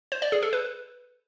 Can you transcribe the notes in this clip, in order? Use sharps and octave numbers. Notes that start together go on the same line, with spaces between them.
C5
D5
G#4
A4
B4